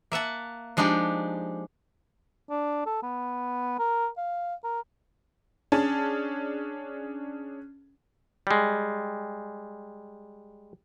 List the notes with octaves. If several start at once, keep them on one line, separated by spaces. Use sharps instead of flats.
A#3 E5 F#5 A5
F3 G#3 D4 D#4 G4
D4
A4
B3
A#4
F5
A#4
C#4 D4 G#4 A5
G3 G#3